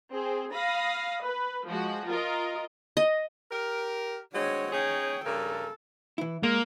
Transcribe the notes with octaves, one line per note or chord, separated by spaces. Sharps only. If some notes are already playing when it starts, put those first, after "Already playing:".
C4 G#4
F5 B5 D#6 A#6
B4
F3 G#3 F#4
F4 A#4 D#5
D#5
G4 A#4
G#3 C4 D4 F#4 C#5
C#4 D#4 G#4 C#5 G5
G2 C#3 A4 A#4
E3 E4
G#3 A#3